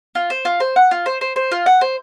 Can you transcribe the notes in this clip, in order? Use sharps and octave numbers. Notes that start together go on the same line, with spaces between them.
F4
C5
F4
C5
F#5
F4
C5
C5
C5
F4
F#5
C5